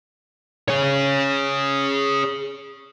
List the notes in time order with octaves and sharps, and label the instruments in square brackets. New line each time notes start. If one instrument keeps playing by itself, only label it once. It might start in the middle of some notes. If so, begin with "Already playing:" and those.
[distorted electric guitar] G#4 C#5